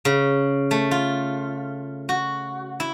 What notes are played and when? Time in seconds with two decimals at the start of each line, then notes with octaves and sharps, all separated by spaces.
0.05 C#3
0.71 A3
0.91 F4
2.09 F#4
2.80 E4